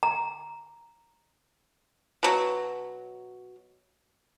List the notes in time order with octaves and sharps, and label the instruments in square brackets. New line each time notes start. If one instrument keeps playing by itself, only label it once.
[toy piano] A#5
[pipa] B2 F#3